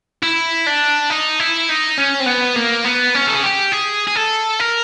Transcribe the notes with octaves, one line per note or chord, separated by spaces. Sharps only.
E4
D4
D#4
E4
D#4
C#4
C4
B3
A#3
B3
C#4
A4
G#4
G4
G#4
G#4
A4
A#4